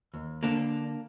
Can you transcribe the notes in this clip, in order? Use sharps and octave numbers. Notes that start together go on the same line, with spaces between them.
D#2
D3 A#3 D4